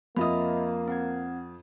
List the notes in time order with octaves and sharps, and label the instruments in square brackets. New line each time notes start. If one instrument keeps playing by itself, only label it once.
[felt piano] F2 F4 D#6 [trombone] A#3 [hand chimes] D#5 E5 B5
[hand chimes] C4 F#5 G#6